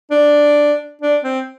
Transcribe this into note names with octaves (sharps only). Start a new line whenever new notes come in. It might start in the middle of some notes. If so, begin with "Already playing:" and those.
D4
D4
C4